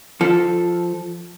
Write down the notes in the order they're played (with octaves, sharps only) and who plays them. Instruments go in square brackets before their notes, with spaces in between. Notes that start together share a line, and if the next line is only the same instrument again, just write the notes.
[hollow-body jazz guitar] F3 A4